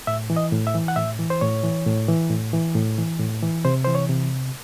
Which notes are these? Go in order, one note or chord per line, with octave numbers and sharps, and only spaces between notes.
A2 E5
E3
D#5
A2
E5
E3
F#5
A2 E5
E3
C5
A2 C#5
E3
A2
E3
A2
E3
A2
E3
A2
E3
C3 C5
E3 C5
C#5
C3